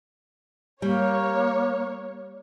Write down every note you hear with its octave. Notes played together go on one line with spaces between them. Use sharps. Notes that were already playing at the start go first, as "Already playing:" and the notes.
G3 A#3 C#5